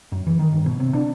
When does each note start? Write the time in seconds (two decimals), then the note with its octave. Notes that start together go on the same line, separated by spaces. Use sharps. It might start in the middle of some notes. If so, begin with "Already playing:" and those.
0.12 F#2
0.27 E3
0.39 D#3
0.52 G1
0.66 B2
0.80 C3
0.95 D4